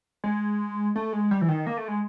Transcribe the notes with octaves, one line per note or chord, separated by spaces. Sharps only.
G#3
A3
G#3
G3
E3
D#3
A#3
A3
G#3